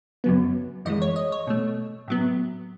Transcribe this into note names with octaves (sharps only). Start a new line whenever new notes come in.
F#2 C#3 F#3 B3
F#2 E3 G#3 D#5
C#5
D#5
C#5
B2 A3
A2 F#3 B3